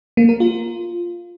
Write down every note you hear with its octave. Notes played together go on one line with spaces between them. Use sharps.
A#3
A#4
F4